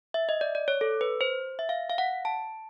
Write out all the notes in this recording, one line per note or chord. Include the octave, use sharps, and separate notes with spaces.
E5
D#5
D5
D5
C#5
A4
B4
C5
E5
F5
F5
F#5
A5